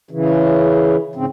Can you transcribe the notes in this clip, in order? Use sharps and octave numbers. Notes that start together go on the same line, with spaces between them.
C#3 E3
G#2 C#3 C4